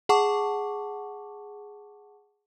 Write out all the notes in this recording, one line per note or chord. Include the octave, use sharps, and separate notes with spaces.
G#4 F#5 A5 C#6 D6